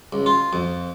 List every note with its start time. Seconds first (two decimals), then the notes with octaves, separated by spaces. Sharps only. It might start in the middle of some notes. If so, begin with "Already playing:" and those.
0.13 C#2
0.26 F4
0.53 F2